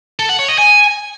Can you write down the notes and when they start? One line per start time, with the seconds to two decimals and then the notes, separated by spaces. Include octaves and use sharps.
0.19 A4
0.29 F#5
0.39 C#5
0.49 D#5
0.58 G#5